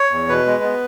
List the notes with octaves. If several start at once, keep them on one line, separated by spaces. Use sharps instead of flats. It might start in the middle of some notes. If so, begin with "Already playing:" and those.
Already playing: C#5
E2
B2 B4
G#3
B3